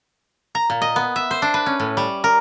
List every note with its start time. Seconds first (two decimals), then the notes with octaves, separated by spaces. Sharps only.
0.55 A#5
0.70 A#2
0.82 D#5
0.96 B3
1.16 E5
1.31 C5
1.42 D4
1.54 B4
1.66 C#4
1.80 A2
1.97 G3
2.24 A#4